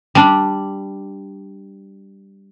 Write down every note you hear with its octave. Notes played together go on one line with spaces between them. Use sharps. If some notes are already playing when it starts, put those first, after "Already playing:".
G3 D4